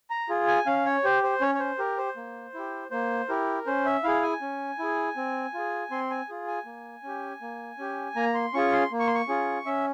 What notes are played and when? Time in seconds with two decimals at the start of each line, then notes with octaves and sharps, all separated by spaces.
0.10 A#5
0.29 F4 G#4
0.48 G#5
0.66 C#4 F5
0.86 C#5
1.04 G4 C5
1.23 C5
1.41 C#4 C#5
1.55 C#5
1.60 C5
1.79 G4 A#4
1.98 C5
2.16 A#3
2.54 E4 G4
2.91 A#3 C5
3.29 E4 G4 A#4
3.67 C#4 C5
3.85 E5
4.04 E4 G#4 F5
4.23 G#5
4.41 C#4
4.79 E4 G#4
5.16 C4
5.54 F4 G#4
5.91 C4 C6
6.10 G#5
6.29 F4 G#4
6.48 G#5
6.66 A#3
7.03 C#4 G4
7.41 A#3
7.78 C#4 G4
8.16 A#3 A#5
8.34 C6
8.54 C#4 F4 G#4 C#6
8.72 C6
8.91 A#3
8.99 C#6
9.07 C6
9.15 C#6
9.28 C#4 F4 G#4
9.66 C#4 E5